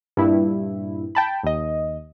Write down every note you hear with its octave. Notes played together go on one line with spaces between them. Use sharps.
G2 A#2 E4
G5 A5 B5
D#2 D#5